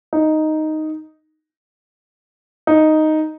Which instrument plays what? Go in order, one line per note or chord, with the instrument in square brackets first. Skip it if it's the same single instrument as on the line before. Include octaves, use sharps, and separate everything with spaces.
[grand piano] D#4
D#4